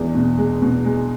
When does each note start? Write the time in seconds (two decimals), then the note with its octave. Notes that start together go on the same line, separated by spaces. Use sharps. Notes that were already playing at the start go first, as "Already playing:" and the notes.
Already playing: E2 G#3 D4
0.15 B2
0.38 G#3
0.62 B2
0.85 G#3